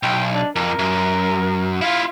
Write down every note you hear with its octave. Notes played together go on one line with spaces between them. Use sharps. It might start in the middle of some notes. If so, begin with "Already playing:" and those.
B1 G5
D4
F2 A#4
F#2
E4 F4 F5